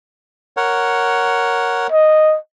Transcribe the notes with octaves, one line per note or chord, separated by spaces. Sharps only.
A#4 C#5 F#5
D#5